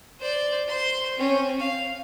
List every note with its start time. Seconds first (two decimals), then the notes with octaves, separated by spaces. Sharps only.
0.19 C5 D5
0.67 C5 C6
1.17 C4 C#4
1.60 F5